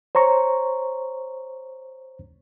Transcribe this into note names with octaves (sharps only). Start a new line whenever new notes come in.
C5 C#5 A#5 C#6